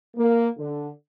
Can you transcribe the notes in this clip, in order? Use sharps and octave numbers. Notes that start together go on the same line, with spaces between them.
A#3
D3